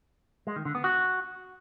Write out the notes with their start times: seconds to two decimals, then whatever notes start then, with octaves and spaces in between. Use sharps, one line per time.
0.47 G#3
0.56 D#3
0.65 D3
0.75 B3
0.84 F#4